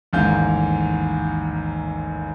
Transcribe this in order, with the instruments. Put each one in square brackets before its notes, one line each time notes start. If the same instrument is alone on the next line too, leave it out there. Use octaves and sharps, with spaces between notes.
[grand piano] A1 D#2 G#2 F5 G6